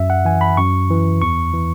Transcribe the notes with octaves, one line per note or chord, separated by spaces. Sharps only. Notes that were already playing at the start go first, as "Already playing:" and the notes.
Already playing: F#2 E5
F#5
E3 G#5
B5
F#2 C#6
E3
E2 C#6
E3